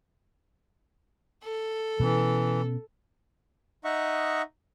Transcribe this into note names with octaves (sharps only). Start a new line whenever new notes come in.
A4
B2 E3 B3 C#4
D#4 D#5 E5 F#5 C#6